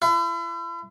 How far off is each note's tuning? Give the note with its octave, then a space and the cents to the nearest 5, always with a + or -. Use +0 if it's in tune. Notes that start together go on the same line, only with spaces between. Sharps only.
E4 +40